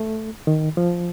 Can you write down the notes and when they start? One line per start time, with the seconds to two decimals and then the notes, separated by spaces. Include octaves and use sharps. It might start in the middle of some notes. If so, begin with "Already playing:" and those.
Already playing: A3
0.47 D#3
0.77 F3